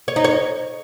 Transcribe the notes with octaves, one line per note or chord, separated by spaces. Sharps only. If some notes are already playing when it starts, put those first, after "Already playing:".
C#5
D#4
C#5